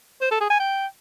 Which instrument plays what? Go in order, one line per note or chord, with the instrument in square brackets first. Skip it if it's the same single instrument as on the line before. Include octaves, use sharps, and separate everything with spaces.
[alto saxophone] C5
A4
G#4
G#5
G5